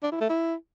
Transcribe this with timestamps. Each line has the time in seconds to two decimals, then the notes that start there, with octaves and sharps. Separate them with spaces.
0.03 D4
0.12 E4
0.21 A3
0.29 E4